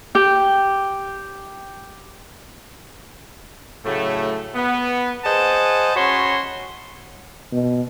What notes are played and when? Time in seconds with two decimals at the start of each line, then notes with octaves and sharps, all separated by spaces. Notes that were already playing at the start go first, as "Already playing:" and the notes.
0.15 G4 G5
3.85 A2 C#3 F#3 A3
4.55 B3
5.24 G#4 C5 D#5 F#5 A5
5.96 C#4 F#4 C#5 B5 C6
7.53 B2